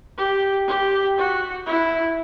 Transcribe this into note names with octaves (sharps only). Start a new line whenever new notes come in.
G4
G4
F#4
E4